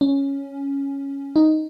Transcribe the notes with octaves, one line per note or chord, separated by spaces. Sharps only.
C#4
D#4